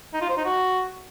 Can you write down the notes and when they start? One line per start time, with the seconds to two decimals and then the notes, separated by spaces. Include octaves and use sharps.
0.14 D#4
0.21 F4
0.29 C5
0.37 D#4
0.45 F#4